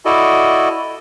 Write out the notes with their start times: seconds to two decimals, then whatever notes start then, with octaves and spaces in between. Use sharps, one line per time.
0.05 E4 F#4 A4 D5 D#5